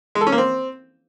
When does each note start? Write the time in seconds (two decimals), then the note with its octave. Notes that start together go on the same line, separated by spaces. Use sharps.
0.15 G#3
0.21 A4
0.27 C#4
0.32 A#3
0.38 C4